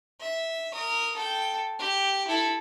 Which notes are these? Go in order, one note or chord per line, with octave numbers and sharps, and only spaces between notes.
E5
A#4 D#6
A4 G5
G4
E4 A4